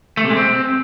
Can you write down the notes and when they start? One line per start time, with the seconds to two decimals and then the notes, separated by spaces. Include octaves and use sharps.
0.17 A3
0.24 C3
0.30 G#3
0.37 C4